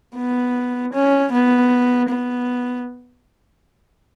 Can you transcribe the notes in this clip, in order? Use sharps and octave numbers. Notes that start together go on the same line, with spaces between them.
B3
C#4
B3
B3